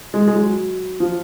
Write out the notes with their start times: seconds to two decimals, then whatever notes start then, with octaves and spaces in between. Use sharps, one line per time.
0.14 G#3
0.28 G#3
0.36 F#3
1.00 F3